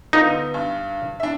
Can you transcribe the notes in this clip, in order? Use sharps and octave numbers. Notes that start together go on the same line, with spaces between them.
D3 B3 D#4 F4
G2
D4 E5